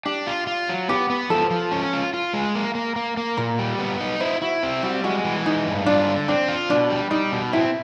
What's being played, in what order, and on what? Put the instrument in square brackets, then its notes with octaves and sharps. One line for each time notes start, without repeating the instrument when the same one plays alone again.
[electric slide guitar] D4 [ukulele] G4
[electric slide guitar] F4
F4
F#3
[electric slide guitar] B3 [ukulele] G4
[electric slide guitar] B3
[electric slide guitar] F3 [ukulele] A4
[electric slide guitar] F3
C#4
F4
F4
G#3
A#3
A#3
A#3
A#3
[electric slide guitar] A#2 [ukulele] A#4
[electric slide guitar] G3
B3
D#4
[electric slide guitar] E4 [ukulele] C5
[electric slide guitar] E4 [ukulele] F#4
[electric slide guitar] C4
[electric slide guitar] G3 [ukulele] F#4
[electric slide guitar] G#3 [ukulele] F#4
[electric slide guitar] E3
[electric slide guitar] G#3 [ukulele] D#4
[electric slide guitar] G2
[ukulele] D4 [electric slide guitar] F4
[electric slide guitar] D3
[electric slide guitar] C4 [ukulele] D4
[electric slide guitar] F4
[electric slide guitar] B2 [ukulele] D4
[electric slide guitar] G3
[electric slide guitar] G3 [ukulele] D#4
[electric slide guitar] B2
[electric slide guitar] C4 [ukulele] E4